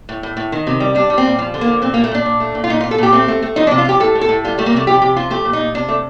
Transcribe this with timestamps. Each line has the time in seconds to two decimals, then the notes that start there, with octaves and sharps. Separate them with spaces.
0.09 A2
0.23 A2
0.37 A2
0.52 D#3
0.67 C3
0.80 G3
0.95 G3 D4
1.10 G3
1.18 C4
1.25 A#2
1.39 F3
1.54 D3
1.61 A#3
1.68 F3
1.82 A#2 C4
1.94 A#3
1.97 A#2
2.04 A3
2.12 A#2 D4
2.26 A#2
2.40 A3
2.55 A#2
2.64 F4
2.70 A#2 D#4
2.81 F4
2.83 A#2
2.91 A4
2.98 A#2 G4
3.13 A3 C4
3.28 A3
3.43 A3
3.56 F3 D#4
3.67 D4
3.71 C3
3.78 F4
3.85 F3 G4
4.00 A2 A4
4.15 A2
4.21 A4
4.29 A2
4.44 G3 F4
4.58 G3 A3
4.66 A#3
4.73 C3 A3
4.87 F3 G4
5.02 C3 G4
5.16 F3 F4
5.30 A3 G4
5.45 A#2
5.53 D#4
5.60 A#2
5.75 C3 D4
5.88 A3